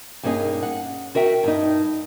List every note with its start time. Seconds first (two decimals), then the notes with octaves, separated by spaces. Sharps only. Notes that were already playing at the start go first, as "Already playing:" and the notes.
0.23 G2 A#3 C#4 D#4 G#4 G#5
0.63 F#5
1.15 F#4 A#4 E5 G5
1.44 G2 D#4